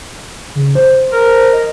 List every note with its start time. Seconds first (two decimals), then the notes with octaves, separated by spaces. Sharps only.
0.55 C#3
0.75 C5
1.13 A#4
1.53 D#5